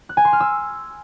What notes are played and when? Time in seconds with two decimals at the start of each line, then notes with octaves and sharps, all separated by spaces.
0.09 F#6
0.17 G#5
0.25 C6
0.33 F6
0.40 E6